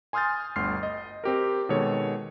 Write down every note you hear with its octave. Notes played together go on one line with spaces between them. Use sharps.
G#5 C6 D#6 F6 G6 A6
G1 D2 C6 F6 C7
D#5
C4 G4 A#4
B2 D#3 G#3 A4 C#5